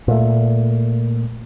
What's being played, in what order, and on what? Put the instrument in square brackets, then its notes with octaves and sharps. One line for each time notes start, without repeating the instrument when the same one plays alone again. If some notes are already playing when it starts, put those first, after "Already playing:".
[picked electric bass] A#2 A3